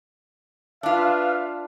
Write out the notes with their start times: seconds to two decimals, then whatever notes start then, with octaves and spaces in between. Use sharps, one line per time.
0.83 D4 F4 B4 E5 F5